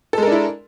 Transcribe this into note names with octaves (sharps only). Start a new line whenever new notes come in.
G#3 D4 E4 A4 A#4